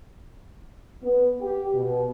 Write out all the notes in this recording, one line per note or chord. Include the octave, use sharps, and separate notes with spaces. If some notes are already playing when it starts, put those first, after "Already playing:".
B3
G4
B2